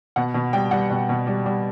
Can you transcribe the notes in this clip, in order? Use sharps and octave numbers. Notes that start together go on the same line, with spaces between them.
B2 F#5
B2
G3 G5
G3 F#5
B2
B2
G3
G3